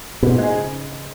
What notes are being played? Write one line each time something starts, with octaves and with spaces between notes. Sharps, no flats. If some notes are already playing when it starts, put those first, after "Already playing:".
G#2 B2
G#3 D#4 G#4
C#3